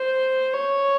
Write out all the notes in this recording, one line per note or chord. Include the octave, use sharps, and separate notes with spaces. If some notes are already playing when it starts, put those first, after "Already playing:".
Already playing: C5
C#5